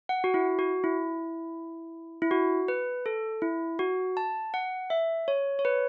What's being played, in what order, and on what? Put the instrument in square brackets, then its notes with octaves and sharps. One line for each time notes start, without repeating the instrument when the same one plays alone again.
[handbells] F#5
F#4
E4
F#4
E4
E4
F#4
B4
A4
E4
F#4
A5
F#5
E5
C#5
C#5
B4